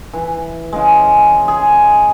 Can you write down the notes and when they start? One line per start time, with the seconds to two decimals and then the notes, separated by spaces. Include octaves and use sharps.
0.13 E3
0.73 C#3 G#3
1.48 G#4